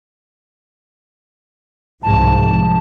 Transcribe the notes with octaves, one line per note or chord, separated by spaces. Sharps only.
C2 G#2 F3 A5